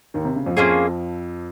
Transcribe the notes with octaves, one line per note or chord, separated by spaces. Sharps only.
D#2 D#3
C3
C#3
F2 F3
F2 F3 A#3 C#4 F4 G#4